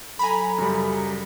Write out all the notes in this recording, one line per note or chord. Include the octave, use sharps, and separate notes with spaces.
F#3 A4 G#5 A#5 B5
F#2 C#3 G3